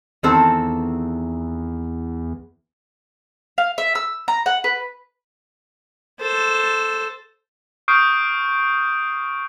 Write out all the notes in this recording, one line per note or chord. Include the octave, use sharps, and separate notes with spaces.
E2 D#3 C4 A4
F5
E5
E6
A#5
F#5
B4
A4 C5
C#6 D#6 F6 G6 C7 D7